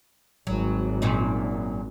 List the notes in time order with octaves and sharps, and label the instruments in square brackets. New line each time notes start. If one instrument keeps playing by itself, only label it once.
[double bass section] G#1 [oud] F#3
[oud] F#2 A#2 D#4